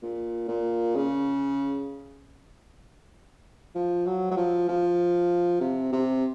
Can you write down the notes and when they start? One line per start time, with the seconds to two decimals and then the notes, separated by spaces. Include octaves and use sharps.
0.02 A#2
0.48 A#2
0.96 C#3
3.75 F3
4.06 F#3
4.31 F#3
4.37 F3
4.69 F3
5.61 C3
5.93 C3